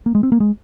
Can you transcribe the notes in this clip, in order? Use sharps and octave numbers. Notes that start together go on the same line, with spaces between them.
A#3
G#3
C4
A#3
G#3